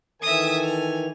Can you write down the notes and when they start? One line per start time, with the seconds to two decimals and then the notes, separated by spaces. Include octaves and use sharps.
0.22 D#3 E3 A4 E5 G#5 D#6
0.64 F7